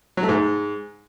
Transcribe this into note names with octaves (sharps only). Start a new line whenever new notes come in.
F#3
A3
G#2